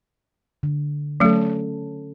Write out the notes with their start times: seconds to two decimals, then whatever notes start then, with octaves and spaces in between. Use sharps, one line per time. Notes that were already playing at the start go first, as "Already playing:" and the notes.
0.63 D3
1.20 F#3 A3 C#4 A4